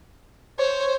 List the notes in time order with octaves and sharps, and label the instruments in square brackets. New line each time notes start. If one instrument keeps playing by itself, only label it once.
[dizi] C5 [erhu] C#5